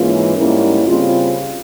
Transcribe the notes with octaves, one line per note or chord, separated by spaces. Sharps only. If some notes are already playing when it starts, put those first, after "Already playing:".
Already playing: G#2 E3 A#3 C#4 F4
G#2 G3 A#3 C#4 E4
C#3 G3 C4 F4